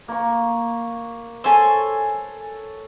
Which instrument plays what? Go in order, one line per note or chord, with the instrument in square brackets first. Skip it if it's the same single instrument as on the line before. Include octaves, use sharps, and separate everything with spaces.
[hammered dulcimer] A#3 C#6
[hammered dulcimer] A4 C#5 [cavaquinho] C5 G#5 A5